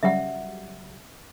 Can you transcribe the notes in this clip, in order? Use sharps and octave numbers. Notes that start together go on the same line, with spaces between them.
C#3 F#3 G3 E5 F#5